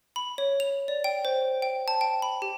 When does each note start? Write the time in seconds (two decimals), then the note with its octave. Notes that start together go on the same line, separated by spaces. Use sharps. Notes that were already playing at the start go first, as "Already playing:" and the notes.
0.16 B5
0.38 C#5
0.60 F7
0.88 D5
1.04 G5
1.25 C5
1.62 G5
1.88 A5
2.01 G5
2.22 B5
2.42 G4